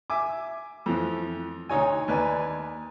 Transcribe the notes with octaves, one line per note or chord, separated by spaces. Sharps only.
E5 G#5 D6
F2 E3 F3
D2 D#4 C#5 G#5
D#2 B4 D5 G#5